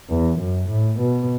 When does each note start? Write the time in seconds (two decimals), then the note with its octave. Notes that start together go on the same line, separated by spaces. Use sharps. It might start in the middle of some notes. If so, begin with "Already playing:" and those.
0.09 E2
0.39 F#2
0.69 A2
1.00 B2